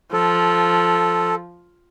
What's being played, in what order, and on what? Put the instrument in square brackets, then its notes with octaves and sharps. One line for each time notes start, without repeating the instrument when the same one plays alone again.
[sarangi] F3 [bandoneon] A4